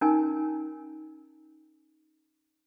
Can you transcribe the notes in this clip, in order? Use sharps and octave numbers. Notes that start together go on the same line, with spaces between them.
C#4 D#4 A#4 G#5